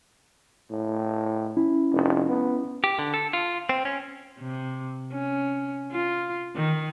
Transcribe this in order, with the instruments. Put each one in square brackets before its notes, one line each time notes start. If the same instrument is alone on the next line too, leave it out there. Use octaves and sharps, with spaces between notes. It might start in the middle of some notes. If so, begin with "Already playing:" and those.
[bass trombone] A2
[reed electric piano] C#4 E4
[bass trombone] F1
B3
[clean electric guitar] G4
D3
A4
F4
C4
C#4
[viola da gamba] C3
C#4
F4
D#3